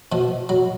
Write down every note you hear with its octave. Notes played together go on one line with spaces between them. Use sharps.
B2 F3
F#3